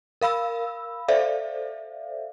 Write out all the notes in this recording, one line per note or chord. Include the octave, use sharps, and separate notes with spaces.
A#4 F5 B5 E6
A4 C5 D5 E5 F5